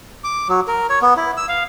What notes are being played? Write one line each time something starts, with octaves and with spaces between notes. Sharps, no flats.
D6
F#3
A#4
C#5
B3
E4
E6
F5